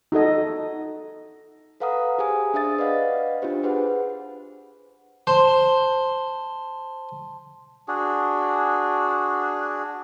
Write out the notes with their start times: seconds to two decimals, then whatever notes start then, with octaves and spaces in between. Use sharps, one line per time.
0.12 D#4 F#4 A4 D#5
1.80 A4 B4 F5 F#5 A#5 D#6
2.18 G4 G#4 C5 G#5 D#6
2.54 D4 G#4 C5 E5 D#6 A6
2.78 B4 D5 D#5 F5 F#5
3.42 D4 F4 G4 C5
3.63 G#4 B4 C5 F#5
5.27 C5 A5 C6
7.88 D4 F#4 G#4